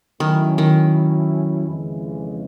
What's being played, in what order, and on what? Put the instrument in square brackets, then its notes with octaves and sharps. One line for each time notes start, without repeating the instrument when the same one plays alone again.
[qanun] D#3 [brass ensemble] F#3 A3 C#4 E4
[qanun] D#3
[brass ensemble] F2 C#3 E3 G#3